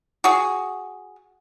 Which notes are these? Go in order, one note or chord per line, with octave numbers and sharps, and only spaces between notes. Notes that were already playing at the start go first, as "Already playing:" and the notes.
F#4 G#4